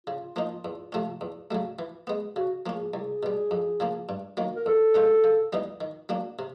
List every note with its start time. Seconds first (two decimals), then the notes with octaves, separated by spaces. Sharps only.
0.07 C#3 F4
0.36 F3 A#3 D#4
0.65 E2
0.92 C3 F3 A3 C#4
1.21 E2
1.51 C#3 F#3 A3
1.79 E3
2.07 G#3 B3
2.36 C#3 F#4
2.66 F3 A#3 C#4
2.75 G#4
2.94 C2 G#4
3.23 B2 G3
3.51 F2
3.80 C#3 F3 A#3
4.09 G2
4.37 D#3 F#3 A#3
4.56 A#4
4.66 E2 A4
4.94 B2 G#3 C#4 F4
5.24 C#3
5.53 E3 G3 B3 D#4
5.81 D#3
6.09 F#3 A#3 D4
6.39 C3